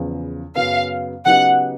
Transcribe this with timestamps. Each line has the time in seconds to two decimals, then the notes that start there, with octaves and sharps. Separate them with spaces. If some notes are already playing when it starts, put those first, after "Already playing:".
Already playing: E2 C#3 F3
0.55 F#2 C#3 F#3 B3 F5
1.26 C#3 F#3 B3 D#4 G4 F#5